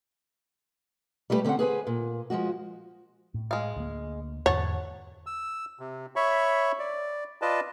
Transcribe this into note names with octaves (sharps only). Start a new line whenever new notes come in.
G3 A3 E4 G4 B4
D3 C4 C#4 A4 F#5
G#4 B4 C5 G#5
A#2
F3 F#3 G#3 F#4
A2
G#3 F5
D2 A#3
E2 G#2 D3 C#5 F#5 A5
E6
C3
C#5 E5 B5 C#6
D5
F4 B4 D5 D#5 A5